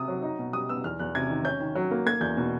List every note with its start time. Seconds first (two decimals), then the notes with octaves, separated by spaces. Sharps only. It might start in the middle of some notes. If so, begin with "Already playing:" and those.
Already playing: C3 D#6
0.08 F#3
0.22 D#4
0.39 B2
0.53 G3 D#6
0.69 B3 E6
0.84 E2 F6
0.99 E2 F#6
1.15 C3 G#6
1.30 D#3
1.45 C#4 G6
1.60 D#3
1.75 F#3
1.91 A#3
2.06 A#3 G#6
2.21 E2 G6
2.37 B2